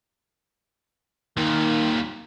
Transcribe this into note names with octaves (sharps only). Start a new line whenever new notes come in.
D#2 A#2 D#3